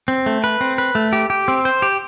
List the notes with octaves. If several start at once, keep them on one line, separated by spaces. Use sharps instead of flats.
C4
A3
B4
C4
B4
A3
G4
G4
C4
C5
G4